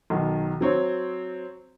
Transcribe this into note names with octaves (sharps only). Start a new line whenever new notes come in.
B1 D#3
F#3 C4 C#5